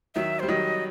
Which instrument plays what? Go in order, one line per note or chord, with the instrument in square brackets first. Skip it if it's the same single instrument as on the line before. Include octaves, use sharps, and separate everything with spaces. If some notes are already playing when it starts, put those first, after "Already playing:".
[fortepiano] D#3 F#3 [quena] E5
[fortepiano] G3 [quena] C5
[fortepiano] D#3 F#3 [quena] D#5